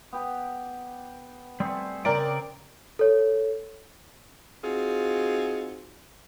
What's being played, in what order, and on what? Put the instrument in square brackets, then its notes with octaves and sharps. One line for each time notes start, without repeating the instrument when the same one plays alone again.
[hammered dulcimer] B3 G4
[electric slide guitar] G3 A3 [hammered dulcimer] C4 G#4 C5
[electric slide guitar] C#3 G5 [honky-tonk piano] A#4 D5
[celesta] A4 C#5
[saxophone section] C4 D#4 F4 F#4 G#4